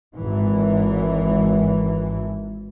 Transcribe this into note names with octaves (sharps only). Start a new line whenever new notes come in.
G#1 E3